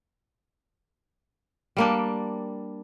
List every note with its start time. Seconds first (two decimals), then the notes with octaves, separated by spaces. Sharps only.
1.77 G3 A#3 D4